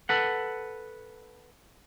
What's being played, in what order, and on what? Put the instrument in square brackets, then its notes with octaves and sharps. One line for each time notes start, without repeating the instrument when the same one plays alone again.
[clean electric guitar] A4 B4 F#5